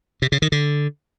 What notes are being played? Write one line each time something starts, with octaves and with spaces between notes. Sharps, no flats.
C3
C#3
D#3
D3